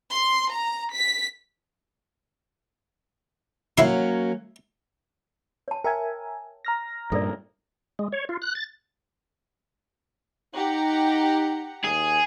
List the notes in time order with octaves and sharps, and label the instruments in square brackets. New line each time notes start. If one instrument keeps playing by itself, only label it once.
[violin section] C6
A#5
B6
[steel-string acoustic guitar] F#3 A#3 C#4 [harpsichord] E4 C6
[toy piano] C#5 A5
[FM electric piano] A#4 E5 G#5 [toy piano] G5
[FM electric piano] A#5 F6 A#6
[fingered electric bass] G2 A#2 [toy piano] A4 A#4 D5
[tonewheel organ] G#3
C#5
F4
F#6
A6
[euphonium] D#4 [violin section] G4 F#5 A#5
[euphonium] D#2 [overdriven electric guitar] G#4